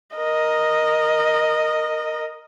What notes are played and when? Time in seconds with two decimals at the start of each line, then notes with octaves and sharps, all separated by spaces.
0.16 A#4 D#5